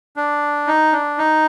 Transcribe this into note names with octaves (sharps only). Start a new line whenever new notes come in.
D4
D#4
D4
D#4